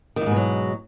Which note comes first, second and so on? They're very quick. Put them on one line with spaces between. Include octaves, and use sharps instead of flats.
D#3 F2 G#2 B2 F#3